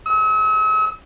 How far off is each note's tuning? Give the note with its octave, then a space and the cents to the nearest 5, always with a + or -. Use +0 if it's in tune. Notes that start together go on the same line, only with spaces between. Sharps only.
E6 -45